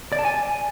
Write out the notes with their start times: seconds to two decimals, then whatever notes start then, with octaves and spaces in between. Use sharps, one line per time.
0.12 D5
0.19 A5
0.25 G#5